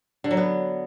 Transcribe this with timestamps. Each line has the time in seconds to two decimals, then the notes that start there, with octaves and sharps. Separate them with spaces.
0.24 D3
0.31 F#3
0.37 B3